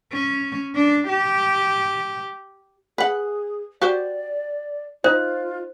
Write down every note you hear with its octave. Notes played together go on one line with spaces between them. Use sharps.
C#4
D4
G4
G#4 B4 F#5
F#4 G4 C5 D5
D#4 F4 C5